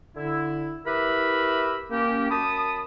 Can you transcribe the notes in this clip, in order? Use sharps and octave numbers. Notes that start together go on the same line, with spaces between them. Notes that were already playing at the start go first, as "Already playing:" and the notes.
D3 E4
E4 G4 A#4 B4 E5 B5
A#3 C#4 G4
F#2 A5 B5 D#6